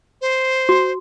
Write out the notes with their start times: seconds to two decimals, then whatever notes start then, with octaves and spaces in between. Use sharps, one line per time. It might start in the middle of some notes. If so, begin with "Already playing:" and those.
0.21 C5
0.69 F#4